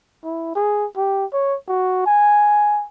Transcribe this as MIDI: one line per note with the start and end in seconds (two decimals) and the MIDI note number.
0.24 0.52 64
0.55 0.86 68
0.97 1.25 67
1.33 1.56 73
1.68 2.03 66
2.06 2.86 80